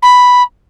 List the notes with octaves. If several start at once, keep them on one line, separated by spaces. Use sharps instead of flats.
B5